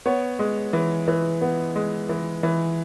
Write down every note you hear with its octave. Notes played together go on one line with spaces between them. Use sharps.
B3 C#5
G#3
E3
E3
B3
G#3
E3
E3